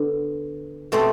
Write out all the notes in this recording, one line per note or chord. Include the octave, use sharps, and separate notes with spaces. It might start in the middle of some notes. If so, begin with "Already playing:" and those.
Already playing: D3 B3
B2 A3 C4 G4 C5